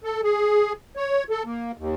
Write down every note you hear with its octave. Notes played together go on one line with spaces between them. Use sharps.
A4
G#4
C#5
A4
A#3
D#2